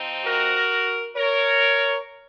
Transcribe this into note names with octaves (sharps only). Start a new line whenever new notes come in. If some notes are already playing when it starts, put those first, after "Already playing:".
Already playing: F3 C4 D#4
F#4 A#4
A#4 C#5